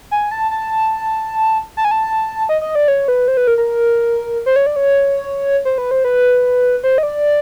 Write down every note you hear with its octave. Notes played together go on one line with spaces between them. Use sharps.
G#5
A5
A5
A5
G#5
A5
D#5
D#5
D5
C#5
B4
C5
B4
A#4
A#4
C5
C#5
D5
C#5
C5
B4
C5
B4
C5
D#5
D5